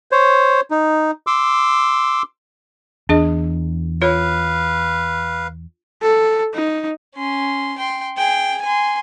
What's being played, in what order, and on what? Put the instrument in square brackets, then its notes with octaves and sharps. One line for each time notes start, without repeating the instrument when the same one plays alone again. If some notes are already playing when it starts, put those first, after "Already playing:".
[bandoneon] C5 C#5
D#4
C6 D6 E6
[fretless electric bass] E2 [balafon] D4 G#4 D#5
[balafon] F4 C#5 [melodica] B4 F5
[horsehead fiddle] A4
D#4
[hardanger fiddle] C#4 C6
G5 C6
G#4 G5
G#5 C6